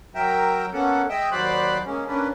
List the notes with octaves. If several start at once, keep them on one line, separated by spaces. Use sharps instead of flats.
F#3 A#4 E5 G5
A#3 B3 C#4 A4 F#5
G#3 D#5 E5 G5
D#2 F#3 C5 D5 B5 F#6
G#3 A#3 C#4
A#3 C#4 D4 B4